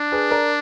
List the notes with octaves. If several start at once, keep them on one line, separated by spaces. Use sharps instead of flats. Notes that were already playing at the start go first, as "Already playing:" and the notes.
Already playing: D4
G#4 B4
A#4 D5